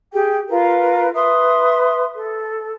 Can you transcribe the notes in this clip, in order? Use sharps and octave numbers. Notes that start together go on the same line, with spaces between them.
G4 G#4 G5
F4 A#4 B4
B4 E5 C6 D#6
A4